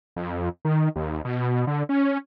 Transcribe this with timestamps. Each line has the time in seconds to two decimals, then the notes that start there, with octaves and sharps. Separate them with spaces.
0.16 F2
0.65 D#3
0.96 D#2
1.25 B2
1.67 D3
1.89 C#4